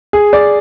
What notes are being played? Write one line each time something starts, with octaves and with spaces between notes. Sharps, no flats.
G#4
D5